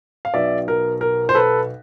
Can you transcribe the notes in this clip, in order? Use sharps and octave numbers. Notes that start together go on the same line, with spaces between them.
F5
B1 B2 D5 E5
A#4
A#4
C5
A4 B4